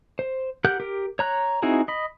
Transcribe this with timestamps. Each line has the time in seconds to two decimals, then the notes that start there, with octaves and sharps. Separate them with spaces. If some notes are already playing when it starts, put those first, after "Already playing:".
0.19 C5
0.64 G4 A#4 F#5 F#6 G6
0.80 G4 A#4
1.19 C#5 A#5 F#6
1.62 C4 D#4 E4 F#4 G#4
1.88 D#5 B5